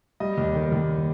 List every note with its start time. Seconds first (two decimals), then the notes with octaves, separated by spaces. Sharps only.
0.20 G3 D#5
0.38 D#2
0.55 D#3
0.72 D#2